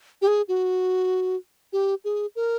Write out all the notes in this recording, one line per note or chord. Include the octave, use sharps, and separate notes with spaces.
G4
G#4
F#4
G4
G#4
A#4